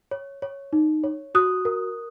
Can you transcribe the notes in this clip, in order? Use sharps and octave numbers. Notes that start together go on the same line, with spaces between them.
C#5
C#5
D#4
C#5
F#4 D#6 F#6
A#4